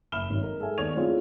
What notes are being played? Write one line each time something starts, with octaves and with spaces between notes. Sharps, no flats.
F#1 E5 B5 F6 E7 G7
G#1 F#3
D#4 A#4
G#3 A4 E5 G#5
D#2 B3 D5 C#6 G#6 F7
A3 C4 C#4 E4 F4 G#4